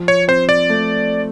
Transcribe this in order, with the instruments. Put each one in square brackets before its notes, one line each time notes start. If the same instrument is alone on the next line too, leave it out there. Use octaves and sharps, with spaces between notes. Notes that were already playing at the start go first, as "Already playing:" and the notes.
Already playing: [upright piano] F3
[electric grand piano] C#5
[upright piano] C4 [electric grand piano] C5
[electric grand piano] D5
[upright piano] A3